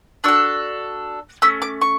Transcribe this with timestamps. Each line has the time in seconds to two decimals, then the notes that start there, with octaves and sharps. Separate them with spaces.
0.24 D4 F#4 A4 E6
1.42 A3 C#4 E6
1.62 D6
1.81 C#6